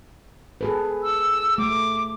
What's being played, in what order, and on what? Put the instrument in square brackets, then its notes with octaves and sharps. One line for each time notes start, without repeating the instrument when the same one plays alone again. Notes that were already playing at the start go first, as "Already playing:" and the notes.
[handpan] G#4 A4 B4
[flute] E6
[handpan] A3 [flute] D6